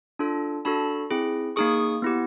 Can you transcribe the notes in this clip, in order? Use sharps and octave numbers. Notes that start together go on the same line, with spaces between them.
D4 F4 A4
D4 F#4 A4 A5 B5
C4 E4 G#4
A#3 D#4 G#4 C#6 D#6
B3 E4 G4